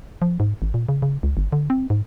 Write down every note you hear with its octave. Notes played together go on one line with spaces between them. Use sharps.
F3
G#2
G#1
A#2
C#3
C#3
C#2
G1
D3
C4
G#2